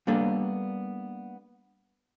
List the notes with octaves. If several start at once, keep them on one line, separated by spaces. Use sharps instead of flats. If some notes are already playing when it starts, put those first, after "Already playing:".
G3 A#3 B3 D4 A4